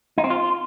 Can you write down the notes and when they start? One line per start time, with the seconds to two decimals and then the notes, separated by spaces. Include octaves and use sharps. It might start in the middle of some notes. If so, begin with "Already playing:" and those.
0.18 D#4
0.24 C4
0.30 F4